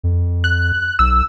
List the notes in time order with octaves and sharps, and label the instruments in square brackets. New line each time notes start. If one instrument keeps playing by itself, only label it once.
[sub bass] F2
[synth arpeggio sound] F#6
[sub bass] B1 [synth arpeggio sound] E6